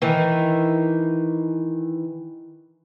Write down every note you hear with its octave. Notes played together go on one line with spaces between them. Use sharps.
D#3 E3